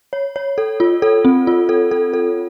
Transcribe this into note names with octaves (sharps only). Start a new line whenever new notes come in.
C#5
C#5
A4
F4
A4
C4
F4
A4
A4
A4